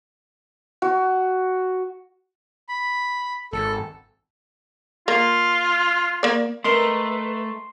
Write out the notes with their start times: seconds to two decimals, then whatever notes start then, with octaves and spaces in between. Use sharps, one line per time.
0.82 F#4
2.69 B5
3.53 G#1 A4
5.08 A#3 F4
6.23 A#3 D5
6.64 A3 A#4 B4 D#5 C6